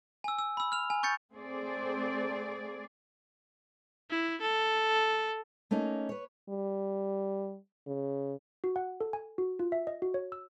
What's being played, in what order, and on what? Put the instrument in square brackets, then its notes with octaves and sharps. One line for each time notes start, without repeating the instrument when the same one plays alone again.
[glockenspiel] G#5 E6
E6
B5 E6
F6 F7
G#5
C#6 G6 A6 C#7
[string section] A3 C4 [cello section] G#4 D5
[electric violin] E4
A4
[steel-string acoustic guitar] A3 A#3 C#4 D#4
B4 C#5
[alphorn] G3
C#3
[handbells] F#4
F#5
A4
G#5
F#4
F4
E5
D#5
F#4
C#5
E6